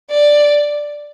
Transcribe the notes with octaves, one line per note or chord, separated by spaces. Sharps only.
D5